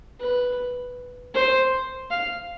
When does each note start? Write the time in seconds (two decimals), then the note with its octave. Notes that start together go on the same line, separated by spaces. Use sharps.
0.20 B4
1.34 C5
2.10 F5